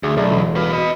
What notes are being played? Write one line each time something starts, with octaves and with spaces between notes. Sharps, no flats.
D2 G#4
B1 A3 D5
E1
B2 B4 F5
D#5 B5